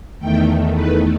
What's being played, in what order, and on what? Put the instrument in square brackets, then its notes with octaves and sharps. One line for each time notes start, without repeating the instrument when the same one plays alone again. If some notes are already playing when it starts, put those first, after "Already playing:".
[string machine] E2 D#3 A3 G5
B4